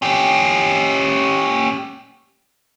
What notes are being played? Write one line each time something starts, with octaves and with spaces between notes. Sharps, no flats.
C#4 G4